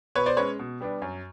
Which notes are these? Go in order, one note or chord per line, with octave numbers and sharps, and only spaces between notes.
B2 B4 C#5
C5 D5
G#3 C#4 B4 C#5
B2
G3 B3 D4
F#2